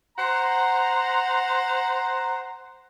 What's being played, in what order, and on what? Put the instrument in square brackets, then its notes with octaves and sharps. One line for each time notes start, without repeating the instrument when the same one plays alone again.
[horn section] C5 F#5 A#5